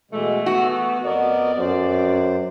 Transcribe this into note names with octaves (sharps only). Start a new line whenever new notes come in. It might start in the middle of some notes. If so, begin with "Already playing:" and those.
B2 E3 G#3 A3
B3 F#4
F2 B3 A#4 D5 D#5
F#2 C5